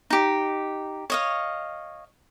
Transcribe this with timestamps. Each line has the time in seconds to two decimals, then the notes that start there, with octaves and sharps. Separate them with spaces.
0.10 D#4 G4
1.10 C#5 D#5 F5